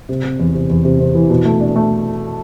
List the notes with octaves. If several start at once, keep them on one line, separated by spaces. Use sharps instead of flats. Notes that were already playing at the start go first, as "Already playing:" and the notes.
C3
C3
E2
C3
E2
C3
C3
E3
B2
A3
D4
A3